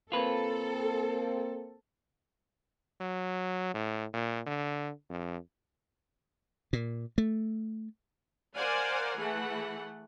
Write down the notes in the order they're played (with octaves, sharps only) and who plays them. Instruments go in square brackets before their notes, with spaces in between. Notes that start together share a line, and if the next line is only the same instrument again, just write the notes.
[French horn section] A#3 C4 [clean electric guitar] F4 B4 [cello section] A4
[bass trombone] F#3
A2
A#2
D3
F2
[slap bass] A#2
A3
[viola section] A#4 C5 D5 F5 F#5 G#5
E3 A3 G#4 F#5